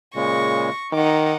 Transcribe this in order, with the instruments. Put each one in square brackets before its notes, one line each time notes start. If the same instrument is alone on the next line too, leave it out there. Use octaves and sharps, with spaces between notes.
[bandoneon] A#2 C#3 G#3 [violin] C#6 A#6
[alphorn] D#3 [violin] D#4 F#5 [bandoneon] D6